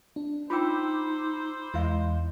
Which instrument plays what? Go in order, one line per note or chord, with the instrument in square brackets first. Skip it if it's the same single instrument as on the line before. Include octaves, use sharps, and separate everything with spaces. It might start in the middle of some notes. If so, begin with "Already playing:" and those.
[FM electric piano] D4
[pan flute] D#4 [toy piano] F4 G5 [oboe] C5 [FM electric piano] B5 D6 E6
[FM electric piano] E2 [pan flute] G#3 [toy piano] E4 F5